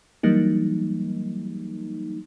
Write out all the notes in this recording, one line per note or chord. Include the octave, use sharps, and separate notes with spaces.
E3 F#3 G3 A#3 D#4